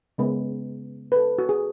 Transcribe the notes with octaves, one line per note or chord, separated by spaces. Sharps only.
C#3 G#3 B3
B4
A4
F#4
G#4